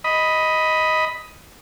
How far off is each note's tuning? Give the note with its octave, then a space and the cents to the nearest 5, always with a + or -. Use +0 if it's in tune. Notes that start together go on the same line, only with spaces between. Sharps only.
D#5 +10 B5 +0